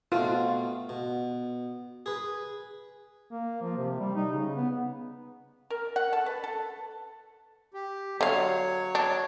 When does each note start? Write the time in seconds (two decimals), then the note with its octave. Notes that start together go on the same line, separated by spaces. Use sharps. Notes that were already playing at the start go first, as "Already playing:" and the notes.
0.12 B2 A3 C4 F4
0.89 B2
2.06 G#4 B4
3.31 A#3
3.62 F3
3.77 C3
4.00 G3
4.16 D#4
4.32 C#3
4.56 B3
5.70 A#4
5.96 F#5
6.13 A4
6.26 B4
6.44 A4
7.74 G4
8.21 D3 F#3 C#5 F5
8.95 D4